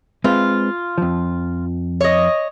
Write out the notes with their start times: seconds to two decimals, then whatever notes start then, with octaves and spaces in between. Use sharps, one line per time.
0.24 G#3 C4 F4 B4
0.98 F2 F3
2.01 C#5 D#5